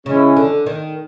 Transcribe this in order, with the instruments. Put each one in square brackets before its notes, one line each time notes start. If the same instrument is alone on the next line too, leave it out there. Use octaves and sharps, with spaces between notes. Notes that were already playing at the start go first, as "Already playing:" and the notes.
[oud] C#3 [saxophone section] E3 G#3 C#4
[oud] D3
D#3